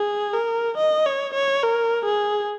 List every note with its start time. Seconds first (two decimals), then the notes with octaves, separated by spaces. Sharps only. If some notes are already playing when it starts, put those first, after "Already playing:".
Already playing: G#4
0.34 A#4
0.78 D#5
1.06 C#5
1.34 C#5
1.63 A#4
2.05 G#4